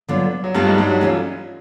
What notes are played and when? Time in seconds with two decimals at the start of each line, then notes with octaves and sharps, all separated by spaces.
0.08 D3 F#3 B3 D4 F4
0.44 F#3
0.54 G2 G3 B3 D4 F4 A4
0.66 G#2 G#3
0.78 G2 G3
0.89 F#3
1.01 E3 A3 C#4 F4